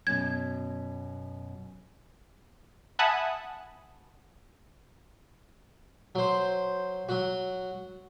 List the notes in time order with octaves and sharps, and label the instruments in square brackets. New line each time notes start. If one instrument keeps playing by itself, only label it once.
[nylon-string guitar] F#2 B2 [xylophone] G#6
[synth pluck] E5 F#5 G#5 A5 B5 D#6
[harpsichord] F#3 C5
F#3 F#4